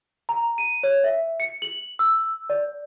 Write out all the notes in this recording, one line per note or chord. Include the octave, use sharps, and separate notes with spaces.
A#5
D#7
C#5
E5
C#7
F#7
E6
D5